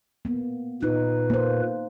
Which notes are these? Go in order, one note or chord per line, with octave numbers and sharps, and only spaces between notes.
A#3 B3
A#2 D#4 B4
A#3 C5